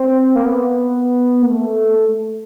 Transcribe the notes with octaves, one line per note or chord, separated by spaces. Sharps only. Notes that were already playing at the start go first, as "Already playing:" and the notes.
Already playing: C4
A#3
B3
A#3
A3